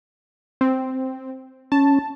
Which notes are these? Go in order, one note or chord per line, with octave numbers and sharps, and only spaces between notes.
C4
C#4 A5